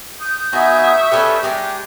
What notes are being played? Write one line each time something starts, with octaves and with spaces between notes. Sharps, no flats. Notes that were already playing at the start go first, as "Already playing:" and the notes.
D#6 G6
B3 D#4 F#4 E5 G#5 C#6
C#4 D4 G4 A4 B4
G#3 D4 D#4 G4